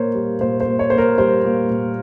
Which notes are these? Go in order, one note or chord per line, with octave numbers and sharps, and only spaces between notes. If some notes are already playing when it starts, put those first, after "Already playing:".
Already playing: A#2 A#3 C5 C#5
G3
A#2 C5
C5
A#2
C#5
A#3 C5
A#4
G3 C5
A#2
A#2